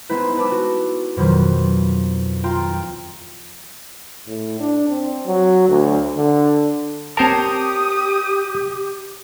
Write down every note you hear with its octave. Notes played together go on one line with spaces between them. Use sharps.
G#3 B3 C4 D#4 E4 B4
B4 A5 D6 E6
F#4
F2 B2 D#3 F3 F#3
F4 G5 A#5
A2
D4
C4
F#3
D2
D3
C4 G4 A#4 C5 C#5 A5 D#6